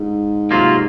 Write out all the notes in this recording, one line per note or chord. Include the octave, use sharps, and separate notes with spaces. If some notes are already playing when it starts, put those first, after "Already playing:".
Already playing: G#2
C3 F#3 A#3 F4